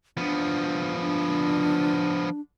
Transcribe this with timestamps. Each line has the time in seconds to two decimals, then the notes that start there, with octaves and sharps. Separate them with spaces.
0.17 F3 B3 D4
1.00 D4